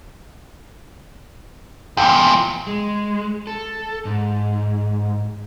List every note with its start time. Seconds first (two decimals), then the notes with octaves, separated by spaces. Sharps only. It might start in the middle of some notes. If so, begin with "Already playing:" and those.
1.97 E2 A#2 G5
2.67 G#3
3.47 A4
4.05 G#2